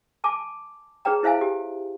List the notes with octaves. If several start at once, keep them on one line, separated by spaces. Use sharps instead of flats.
G#5 A5 D6
D#4 G#4 B4 C#5 G5 A#5
E4 C5 E5 F5 G#5
G4